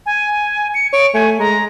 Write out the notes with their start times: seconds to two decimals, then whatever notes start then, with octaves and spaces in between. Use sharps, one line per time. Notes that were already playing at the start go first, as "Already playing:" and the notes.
0.06 G#5
0.74 C#7
0.93 C#5 D7
1.14 A3 G#5
1.39 G#3 A#5